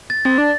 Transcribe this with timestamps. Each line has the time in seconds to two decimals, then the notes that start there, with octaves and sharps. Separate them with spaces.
0.10 A6
0.25 C4 A6
0.38 D4